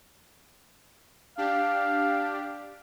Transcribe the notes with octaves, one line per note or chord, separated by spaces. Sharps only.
D4 G4 F5